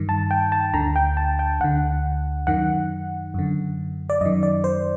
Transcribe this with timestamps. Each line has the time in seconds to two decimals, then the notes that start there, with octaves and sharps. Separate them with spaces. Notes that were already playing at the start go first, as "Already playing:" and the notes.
Already playing: G2 D#3
0.09 A5
0.31 G5
0.52 A5
0.74 D2 D3 A#5
0.96 G5
1.17 A5
1.39 G5
1.60 D2 D3 F#5
2.47 F#2 D#3 F#5
3.34 F#2 D3
4.10 D5
4.21 F#2 D#5
4.25 D#3
4.43 D5
4.64 C5